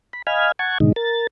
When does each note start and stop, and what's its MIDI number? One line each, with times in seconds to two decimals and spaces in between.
0.13 0.22 83
0.27 0.52 75
0.27 0.52 77
0.27 0.52 80
0.27 0.52 83
0.27 0.52 89
0.27 0.52 92
0.59 0.78 78
0.59 0.78 81
0.59 0.78 85
0.59 0.78 92
0.80 0.93 44
0.80 0.93 47
0.80 0.93 50
0.80 0.93 51
0.80 0.93 56
0.80 0.93 63
0.96 1.27 70
0.96 1.27 93